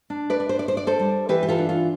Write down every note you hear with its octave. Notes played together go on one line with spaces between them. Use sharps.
D4
B4 D5
D4
C5
D5
D4 C5
D5
A4 C5
G3
E3 G4 B4
G4
F4 A4
D4
F4